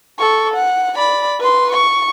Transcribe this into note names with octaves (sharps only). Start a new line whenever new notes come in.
A4 C#6
F#5
D5 B5
B4 C6
C#6